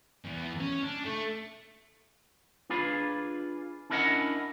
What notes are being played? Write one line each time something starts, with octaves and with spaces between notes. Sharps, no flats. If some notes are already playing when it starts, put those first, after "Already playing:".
E2
C#4
D4
A3
D4 F4 G#4 B4
C#4 D4 E4 A#4 D#5 F#5